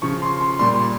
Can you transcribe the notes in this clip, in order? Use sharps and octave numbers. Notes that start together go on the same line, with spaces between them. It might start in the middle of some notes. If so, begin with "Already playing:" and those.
C#3 F3 C#6
C6
C6
A#2 G3 C6